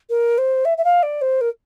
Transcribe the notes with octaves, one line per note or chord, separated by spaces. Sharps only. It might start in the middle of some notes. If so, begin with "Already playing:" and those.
A#4
C5
E5
E5
F5
D5
C5
A#4